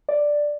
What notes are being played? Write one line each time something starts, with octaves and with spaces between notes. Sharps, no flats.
D5